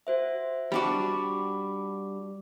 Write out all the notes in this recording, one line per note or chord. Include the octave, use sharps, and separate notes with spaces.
F#4 C5 E5
G3 D4 F#4 B5 D6